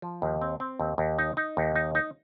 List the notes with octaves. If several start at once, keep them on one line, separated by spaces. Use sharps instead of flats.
F3
D#2
C4
C4
D#2
D#2
D#4
D#4
D#2
D#4
D#4